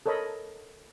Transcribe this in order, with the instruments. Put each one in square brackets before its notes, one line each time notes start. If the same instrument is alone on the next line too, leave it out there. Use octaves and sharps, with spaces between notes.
[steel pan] A4 A#4 C#5 D#5 B5